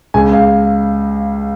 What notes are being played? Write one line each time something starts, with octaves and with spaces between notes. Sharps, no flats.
C#2 C#3 G#5
F5